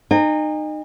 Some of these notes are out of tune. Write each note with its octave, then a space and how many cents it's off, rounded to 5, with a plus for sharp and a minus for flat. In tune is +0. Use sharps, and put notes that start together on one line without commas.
D#4 -25 G#5 -45